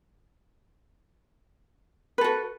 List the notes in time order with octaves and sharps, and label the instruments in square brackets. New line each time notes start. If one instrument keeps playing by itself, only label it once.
[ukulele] B4
A4
F#4